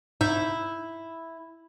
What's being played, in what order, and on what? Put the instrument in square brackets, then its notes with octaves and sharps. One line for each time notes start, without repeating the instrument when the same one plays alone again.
[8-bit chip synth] G#2 D#4 G6 [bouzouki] E4